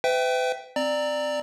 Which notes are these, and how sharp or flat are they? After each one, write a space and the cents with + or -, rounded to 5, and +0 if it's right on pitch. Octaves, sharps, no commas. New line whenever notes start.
B4 +40 E5 +0 G5 +0
C4 +0 D5 +15 A#5 -10